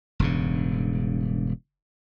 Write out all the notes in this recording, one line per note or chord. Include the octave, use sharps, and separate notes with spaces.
E1 G2 C#3